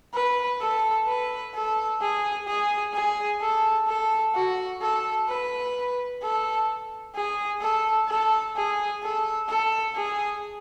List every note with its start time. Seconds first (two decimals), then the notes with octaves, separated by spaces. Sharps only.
0.14 B4
0.61 A4
1.08 B4
1.54 A4
2.01 G#4
2.47 G#4
2.94 G#4
3.41 A4
3.88 A4
4.34 F#4
4.81 A4
5.29 B4
6.22 A4
7.15 G#4
7.61 A4
8.08 A4
8.56 G#4
9.03 A4
9.48 A4
9.95 G#4